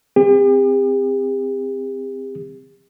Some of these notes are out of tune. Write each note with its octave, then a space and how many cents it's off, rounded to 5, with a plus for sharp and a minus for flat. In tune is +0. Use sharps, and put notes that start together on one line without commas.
C4 -10 G4 +45